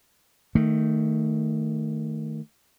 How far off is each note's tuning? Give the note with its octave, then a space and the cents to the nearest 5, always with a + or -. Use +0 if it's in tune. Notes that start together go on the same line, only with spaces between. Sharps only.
D#3 +0 A3 +10